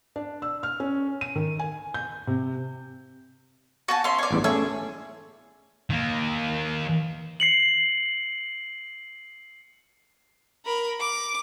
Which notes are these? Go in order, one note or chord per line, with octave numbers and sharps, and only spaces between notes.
D4
E6
F6
C#4
D#7
D#3
G#5
G6
C3
F#4 G#5 A5
C#4 E5 C6
C#5 D5
A1 E2 G2
A3 C#4 G#4 E6
D#3 A#3
C7 C#7 F#7
A#4 B5
D6